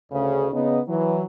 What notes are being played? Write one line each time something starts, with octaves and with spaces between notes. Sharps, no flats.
D2 C#3
C#3 B3 D#4
E3 F#3